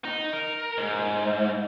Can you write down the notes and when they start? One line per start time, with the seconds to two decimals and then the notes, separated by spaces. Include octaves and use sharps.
0.05 D#4
0.33 A#4
0.77 G#2